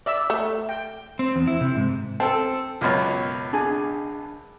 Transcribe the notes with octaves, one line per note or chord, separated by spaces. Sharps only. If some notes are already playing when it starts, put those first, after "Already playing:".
D5 E5 E6
A3
G5
C4
E2
E4
C3
G#2
C4 A4 A5
C#2 F#2 B2 F4 C#5
D4 G#4